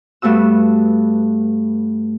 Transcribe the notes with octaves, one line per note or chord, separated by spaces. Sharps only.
G2 A3 B3 F#4 E6